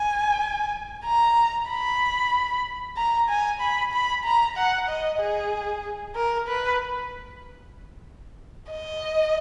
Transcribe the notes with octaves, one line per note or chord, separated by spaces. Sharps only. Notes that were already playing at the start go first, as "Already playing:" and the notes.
Already playing: G#5
A#5
B5
A#5
G#5
B5
B5
A#5
F#5
D#5
G#4
A#4
B4
D#5